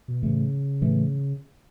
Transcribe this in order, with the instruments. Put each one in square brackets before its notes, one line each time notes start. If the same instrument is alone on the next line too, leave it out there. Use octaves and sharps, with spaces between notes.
[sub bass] B2
[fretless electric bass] A2 E3 A3 [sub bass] C#3
[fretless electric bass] A2 E3 A3